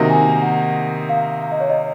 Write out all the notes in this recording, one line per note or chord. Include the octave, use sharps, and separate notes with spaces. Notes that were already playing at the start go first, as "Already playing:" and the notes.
Already playing: C3 D#3 A#3 D#4 F#4
G#5
F#5
F5
F5
D#5
C#5
D#5